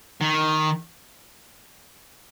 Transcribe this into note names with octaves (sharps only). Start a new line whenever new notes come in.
D#3